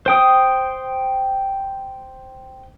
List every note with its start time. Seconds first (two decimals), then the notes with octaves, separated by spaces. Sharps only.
0.06 C5 G5 D#6